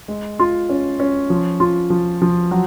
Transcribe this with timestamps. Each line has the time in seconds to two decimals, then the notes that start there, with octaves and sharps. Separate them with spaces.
0.08 G#3
0.39 F4
0.69 C#4
1.00 C#4
1.30 F3
1.60 F4
1.90 F3
2.22 F3
2.51 F#3